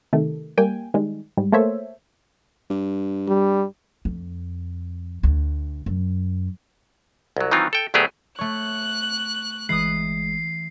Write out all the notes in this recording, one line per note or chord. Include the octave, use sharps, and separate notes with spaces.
C3 D#3 A3
G3 A#3 G5 G#5
D#3 G3 G#3
G#2 G3
A3 A#3 A4 C5 C#5 E5
G2
G3
F2
D2
F#2
C2 F#3
D#3 E3 F#3 C4 D#4 F4
A4 G5
D2 F#3 A3 B3 G4 G#4
A3 C#5 C#6 F#6
G1 E3 G#3 D#6 C7